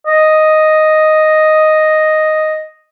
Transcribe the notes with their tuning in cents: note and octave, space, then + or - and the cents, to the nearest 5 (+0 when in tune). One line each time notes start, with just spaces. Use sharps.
D#5 +0